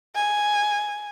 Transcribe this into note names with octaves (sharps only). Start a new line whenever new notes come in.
G#5